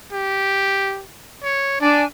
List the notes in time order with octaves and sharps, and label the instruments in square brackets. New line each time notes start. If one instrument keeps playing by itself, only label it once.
[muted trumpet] G4
C#5
[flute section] D4 G#5 [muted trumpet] D5